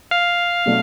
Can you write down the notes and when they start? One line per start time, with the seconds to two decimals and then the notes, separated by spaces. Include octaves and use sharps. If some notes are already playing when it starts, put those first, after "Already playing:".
0.11 F5
0.66 B2 F#3 A3 D4